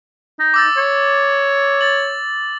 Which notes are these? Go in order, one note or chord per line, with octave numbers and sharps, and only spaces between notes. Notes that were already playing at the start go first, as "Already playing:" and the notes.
D#4
D6 E6 A6
C#5
A6 F#7